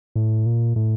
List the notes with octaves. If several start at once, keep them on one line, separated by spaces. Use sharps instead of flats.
A2
A#2
A2